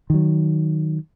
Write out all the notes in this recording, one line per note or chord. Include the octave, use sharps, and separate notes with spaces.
D#3 F#3